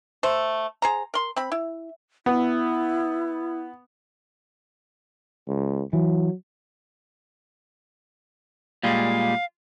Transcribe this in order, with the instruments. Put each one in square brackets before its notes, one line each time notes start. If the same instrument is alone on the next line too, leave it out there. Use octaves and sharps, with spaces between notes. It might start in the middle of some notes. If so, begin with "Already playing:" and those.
[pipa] A3 C5
G#4 C5 A#5
A#4 C6
C4 B5
E4
[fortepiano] B3 [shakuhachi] E4
[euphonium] C#2
[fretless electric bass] E3 [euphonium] F#3
[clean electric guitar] A#2 G3 G#3 [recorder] F5